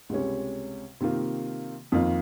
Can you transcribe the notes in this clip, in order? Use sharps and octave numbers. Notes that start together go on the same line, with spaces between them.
C#2 C3 G3 C#4
C3 D#3 A#3 F4
F2 D#3 A#3 F4